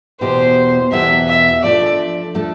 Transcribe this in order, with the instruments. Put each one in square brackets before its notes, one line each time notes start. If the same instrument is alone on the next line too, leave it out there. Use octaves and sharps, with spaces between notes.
[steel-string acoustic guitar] E2 B2 B3 E4 G4 [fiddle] C5
[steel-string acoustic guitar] E2 B2 B3 E4 G4 [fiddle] E5
[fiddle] E5
[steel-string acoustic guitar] F3 A3 D4 A4 [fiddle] D5
[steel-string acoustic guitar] F3 A3 D4 A4